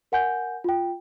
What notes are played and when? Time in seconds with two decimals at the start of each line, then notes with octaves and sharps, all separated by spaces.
0.12 A#4 F#5 G#5 G6
0.64 F4 G5